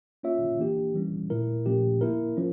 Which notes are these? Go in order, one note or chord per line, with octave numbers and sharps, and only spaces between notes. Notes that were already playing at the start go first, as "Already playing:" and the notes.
A#3 C#4 F4 C#5 E5
E3 A#3 D4 G4
E3 G3 C#4
A#2 A3 E4 A#4
A#2 F3 A3 C#4 G4
A#3 E4 A#4
F3 C#4